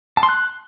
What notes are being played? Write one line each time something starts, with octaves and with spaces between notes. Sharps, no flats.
A5
C6
F#6